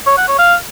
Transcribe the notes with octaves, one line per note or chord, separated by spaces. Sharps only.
C#5
F#5
C#5
F5